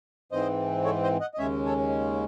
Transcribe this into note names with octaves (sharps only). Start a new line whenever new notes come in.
G#2 E3 C4 C5 D#5
A4 C#5
C5 D#5
D#5 F#5
D#5
D#2 C#3 G#3 C#4 C#5 E5
A4 C#5